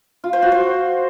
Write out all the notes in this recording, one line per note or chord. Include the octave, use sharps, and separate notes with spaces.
F4
C5
F#4
C5